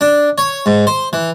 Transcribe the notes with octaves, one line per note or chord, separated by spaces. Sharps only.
D4
C#5
G#2
C5
E3